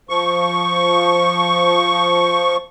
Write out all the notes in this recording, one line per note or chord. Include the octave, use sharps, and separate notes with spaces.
F3 C#6